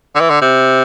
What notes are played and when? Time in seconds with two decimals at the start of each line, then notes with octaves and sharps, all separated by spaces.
0.16 D3
0.21 E3
0.30 D3
0.42 C3